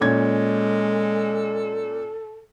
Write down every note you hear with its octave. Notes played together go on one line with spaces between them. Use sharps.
A#2 G#3 C#4 A4 G#6